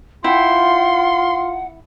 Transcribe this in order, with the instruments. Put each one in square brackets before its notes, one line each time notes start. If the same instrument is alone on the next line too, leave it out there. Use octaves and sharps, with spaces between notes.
[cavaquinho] E4 G5 [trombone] F4 [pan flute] F#5 [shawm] C6